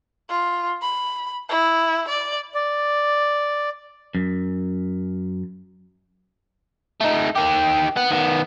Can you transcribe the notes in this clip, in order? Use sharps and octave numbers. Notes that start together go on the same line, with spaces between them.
F4
B5
E4
D5
D5
F#2
A3 D#4
D#3 G4
B3
D#3 B3